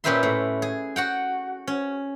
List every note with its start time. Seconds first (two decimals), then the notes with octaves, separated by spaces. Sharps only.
0.04 A#2 C#4 G4 B4 E5 C6
0.23 A2
0.62 G#4
0.96 F#4 F#5 G5
1.67 C#4